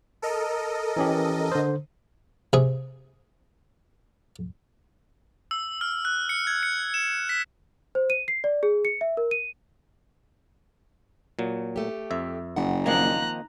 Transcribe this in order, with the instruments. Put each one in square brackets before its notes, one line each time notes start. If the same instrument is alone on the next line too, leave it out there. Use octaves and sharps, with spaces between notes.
[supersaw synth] A4 A#4 D#5
[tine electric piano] E3 C#4 G4
D3 C5
[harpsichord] C3 G#4
[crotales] E6
F6
F#6
C#7
G#6
C#7
E7
B6
[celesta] C5
D#7
C7
D5
G#4
C#7
E5
A#4
D#7
[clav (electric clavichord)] A#2 F#3
[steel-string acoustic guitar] A3 G4
[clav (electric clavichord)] F2 E5
[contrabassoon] F#1 [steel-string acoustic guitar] F#5
[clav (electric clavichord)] D#3 F3 [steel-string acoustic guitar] A#3 C4 D#4 [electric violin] A#5 F#6